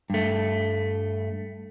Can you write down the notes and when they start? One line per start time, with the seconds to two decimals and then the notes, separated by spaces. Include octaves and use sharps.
0.10 G2 A3